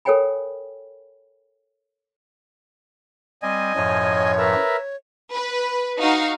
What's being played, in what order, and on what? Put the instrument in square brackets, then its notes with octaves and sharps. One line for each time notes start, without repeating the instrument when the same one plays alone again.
[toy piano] A4 A#4 C#5 G5 G#5 B5
[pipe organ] G3 C4 [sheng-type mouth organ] D#5 G#5
[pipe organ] F#2 A2 F3 [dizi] C#5
[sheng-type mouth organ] A#4 B4 E5
[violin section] B4
D#4 F#4 F5